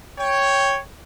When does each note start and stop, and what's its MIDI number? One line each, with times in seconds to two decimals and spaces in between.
0.19 0.79 73
0.19 0.79 79